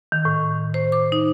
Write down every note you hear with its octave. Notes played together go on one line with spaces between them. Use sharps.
D#3
A2
C5
D6
D#4